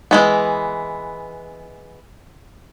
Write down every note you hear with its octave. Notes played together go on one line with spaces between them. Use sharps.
E3 G#3 B3